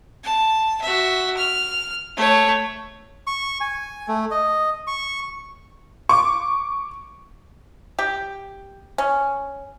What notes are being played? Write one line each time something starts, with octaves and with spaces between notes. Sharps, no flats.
A5
F#4 E5
F6
A3 C#5
C#6
G#5
A3
D#5
C#6
C#6 D6
G4
C#4